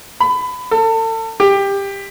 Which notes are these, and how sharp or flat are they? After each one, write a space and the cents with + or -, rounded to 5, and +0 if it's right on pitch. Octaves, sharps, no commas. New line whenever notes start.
B5 +25
A4 +35
G4 +15